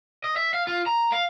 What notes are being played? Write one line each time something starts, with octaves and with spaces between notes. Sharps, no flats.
D#5
E5
F5
F4
A#5
F5